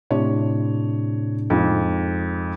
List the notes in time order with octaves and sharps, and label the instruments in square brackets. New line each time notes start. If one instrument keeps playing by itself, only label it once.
[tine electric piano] A2 C3 D4 [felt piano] C#5
[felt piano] F2 G#2